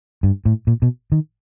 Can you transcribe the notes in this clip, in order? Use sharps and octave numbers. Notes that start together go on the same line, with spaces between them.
G2
A2
A#2
B2
D#3